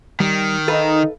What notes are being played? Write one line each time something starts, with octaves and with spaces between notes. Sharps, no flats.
D#3 G3
D#4 A4 B4 F5